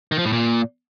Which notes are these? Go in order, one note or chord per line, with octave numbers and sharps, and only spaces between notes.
D#3
F3
A2
A#2